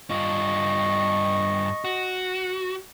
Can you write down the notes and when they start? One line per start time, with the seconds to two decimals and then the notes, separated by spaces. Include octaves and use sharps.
0.10 G2 F4 D#5 C#6
1.84 F#4